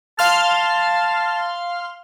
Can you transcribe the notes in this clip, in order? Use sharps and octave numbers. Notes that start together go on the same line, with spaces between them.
F5 A5 C6 F6